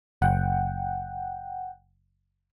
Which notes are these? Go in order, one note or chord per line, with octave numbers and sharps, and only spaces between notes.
F#1 F#5 G5